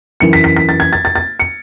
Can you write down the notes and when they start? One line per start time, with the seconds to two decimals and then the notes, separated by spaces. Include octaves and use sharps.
0.20 F#2 E3 C#7
0.33 B6
0.44 B6
0.57 B6
0.69 A6
0.80 G#6
0.93 A6
1.05 A6
1.15 A6
1.40 C#7